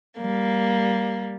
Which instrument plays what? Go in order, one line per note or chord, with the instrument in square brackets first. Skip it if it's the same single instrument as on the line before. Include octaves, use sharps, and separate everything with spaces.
[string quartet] G3 A#3